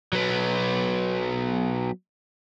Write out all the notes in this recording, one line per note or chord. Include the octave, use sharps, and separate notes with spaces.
F#3 B3